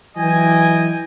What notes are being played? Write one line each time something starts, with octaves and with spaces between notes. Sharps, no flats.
E3 F#3 D#5 G5 G#5